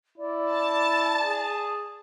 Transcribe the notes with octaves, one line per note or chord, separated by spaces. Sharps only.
E4 D5
A5
G#4